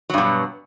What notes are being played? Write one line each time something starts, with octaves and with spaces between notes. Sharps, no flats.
G2 B2 F#3